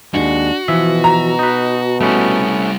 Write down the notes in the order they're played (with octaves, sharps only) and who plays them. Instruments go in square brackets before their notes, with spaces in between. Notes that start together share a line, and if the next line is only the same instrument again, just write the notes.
[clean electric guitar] D#2 G#2 G#3 [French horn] D4 [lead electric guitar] F#4
[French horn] B2 [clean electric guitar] E3 F3 E5
[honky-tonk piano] A#5
[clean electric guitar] D#4 B4
[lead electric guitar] G3 E4 [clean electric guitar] A3 B3 C#4